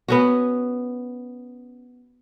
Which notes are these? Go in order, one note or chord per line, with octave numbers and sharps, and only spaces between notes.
B3 C#4 F#4